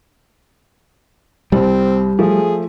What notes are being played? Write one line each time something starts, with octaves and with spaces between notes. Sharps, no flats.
C2 G3 C4
F3 A3 G#4